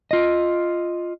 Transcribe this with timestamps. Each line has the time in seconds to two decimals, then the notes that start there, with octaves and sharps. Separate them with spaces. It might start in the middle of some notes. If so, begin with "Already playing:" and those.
0.11 F4 D#5